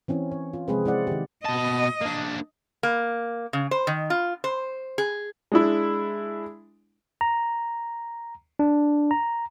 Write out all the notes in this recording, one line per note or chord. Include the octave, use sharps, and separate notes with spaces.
E3 C4 C#4 E4
C#5
F4
C3 F3 G#3 C4 G#4 B4
G#3 C4 E4 C5 D5 F#5
D#3 G4
B2 D#5 A5
A#3 D4
A#3
C#3
C5
D#3
F4
C5
G#4
G#3 D4 E4
A#5
D4
A#5